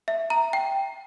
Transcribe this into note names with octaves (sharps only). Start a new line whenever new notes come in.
E5
A#5
G5